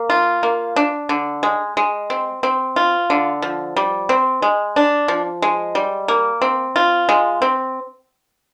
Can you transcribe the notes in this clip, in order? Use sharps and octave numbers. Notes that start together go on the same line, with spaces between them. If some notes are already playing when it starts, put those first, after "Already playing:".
Already playing: A#3
F4
A#3
D4
D3
G#3
G#3
C4
C4
F4
D3
F3
G3
C4
G#3
D4
F3
G#3
G3
A#3
C4
F4
G#3
C4